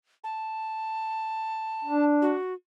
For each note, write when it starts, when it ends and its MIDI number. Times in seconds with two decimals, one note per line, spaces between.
0.24 2.04 81
1.85 2.35 62
2.22 2.54 66